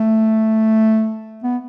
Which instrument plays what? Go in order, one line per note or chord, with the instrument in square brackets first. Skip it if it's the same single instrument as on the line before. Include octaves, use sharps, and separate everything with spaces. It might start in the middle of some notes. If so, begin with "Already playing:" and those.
Already playing: [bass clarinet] A3
B3